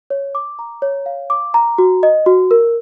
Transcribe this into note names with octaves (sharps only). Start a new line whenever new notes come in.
C#5
D6
A#5
C#5
F5
D6
A#5
F#4
D#5
F#4
A#4